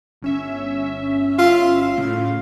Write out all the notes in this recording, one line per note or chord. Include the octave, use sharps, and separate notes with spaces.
G1 C#4 E5
F4
F4
A2 C#3